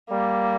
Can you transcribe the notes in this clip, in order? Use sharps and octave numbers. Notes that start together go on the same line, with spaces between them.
G3 A#3